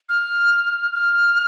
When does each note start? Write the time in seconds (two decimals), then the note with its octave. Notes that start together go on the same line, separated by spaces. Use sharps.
0.09 F6
0.93 F6